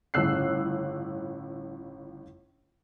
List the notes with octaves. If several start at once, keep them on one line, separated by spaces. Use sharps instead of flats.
G1 A2 C#3 E6 F#6 C7